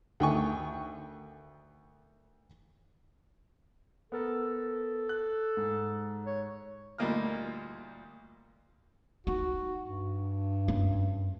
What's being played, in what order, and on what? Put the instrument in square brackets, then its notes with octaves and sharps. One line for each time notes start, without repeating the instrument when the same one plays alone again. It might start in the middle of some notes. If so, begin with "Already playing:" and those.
[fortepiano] D2 D#3 G5 G#5 C#6
[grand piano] B3 A#4 [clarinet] A4
[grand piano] F#6
G#2
[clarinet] C#5
[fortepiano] D2 A#2 G3 A#3 D#4 F6
[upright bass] D#4 [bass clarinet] F#4
[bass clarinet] G2
[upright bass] F#2